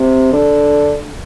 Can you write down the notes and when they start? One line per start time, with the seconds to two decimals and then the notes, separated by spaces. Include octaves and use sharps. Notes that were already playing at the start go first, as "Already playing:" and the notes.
Already playing: C3
0.32 D3